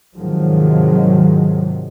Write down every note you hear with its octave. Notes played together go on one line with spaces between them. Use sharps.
G#2 C3 D#3 F3 F#3 G#3